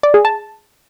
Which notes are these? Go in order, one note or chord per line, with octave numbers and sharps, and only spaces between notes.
D5
G#4
A5